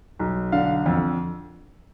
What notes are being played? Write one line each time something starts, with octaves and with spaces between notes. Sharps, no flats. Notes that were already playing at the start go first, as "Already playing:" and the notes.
B1
D3 F5
F2